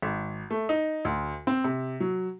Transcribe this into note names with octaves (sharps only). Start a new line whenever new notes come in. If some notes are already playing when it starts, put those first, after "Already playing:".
G#1
A3
D#4
D2
C4
C3
F#3